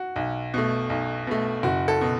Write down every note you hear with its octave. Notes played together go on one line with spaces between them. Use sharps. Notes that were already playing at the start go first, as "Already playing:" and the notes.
Already playing: F#4
B1
B2 A3
B1
B2 A3
F#1 F#4
A4
B2